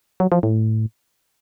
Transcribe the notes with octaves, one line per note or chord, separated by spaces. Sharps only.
F#3
F3
A2